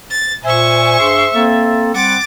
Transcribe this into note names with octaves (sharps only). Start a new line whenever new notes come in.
A6
A#2 C5 E5 G#5 C#6
G2 G#4 C6
A#3 C4 A4
G3 C4 F#5 D6 A6